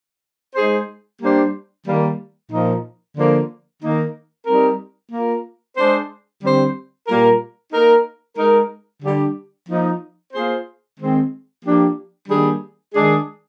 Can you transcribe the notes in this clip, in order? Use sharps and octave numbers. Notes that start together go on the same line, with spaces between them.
G#3 D#4 G#4 C5
G3 A#3 D4 G4 C5
D#3 G3 A#3
A#2 F3 A#3 D#4 A#4
D3 F3 A#3
D#3 A#3 D#4 A#4
G3 C4 D#4 A#4
A#3 F4 A#4
G#3 D4 G#4 C5
D3 G3 C4 G4 C5
A#2 G3 A#3 F4 A#4
A#3 D#4 A#4
G#3 D#4 A#4
D3 G3 D4 G4
F3 A#3 D#4
A#3 F4 G#4 C5
D#3 G#3 C4
F3 A#3 D4 G4
D#3 G3 A#3 D4 G#4
D#3 G#3 D4 G#4